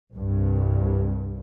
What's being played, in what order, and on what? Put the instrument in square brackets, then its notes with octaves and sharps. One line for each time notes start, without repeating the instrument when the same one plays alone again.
[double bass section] C2 G2